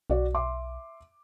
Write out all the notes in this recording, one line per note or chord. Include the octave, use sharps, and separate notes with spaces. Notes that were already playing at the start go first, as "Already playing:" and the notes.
B1 F#4 D5
E5 C6 D6